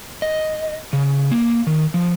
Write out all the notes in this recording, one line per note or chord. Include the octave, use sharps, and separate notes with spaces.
D#5
C#3
A#3
D#3
F3